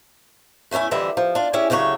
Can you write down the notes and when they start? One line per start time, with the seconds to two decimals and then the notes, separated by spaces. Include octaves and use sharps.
0.71 E2 A3 C#4 E4 G#5
0.91 F2 D3 E3 G3 E5
1.17 F3
1.35 D4 F4
1.53 C#4 E4 G4 G#4 G#5
1.70 D2 C#3 F#3 A3 C#5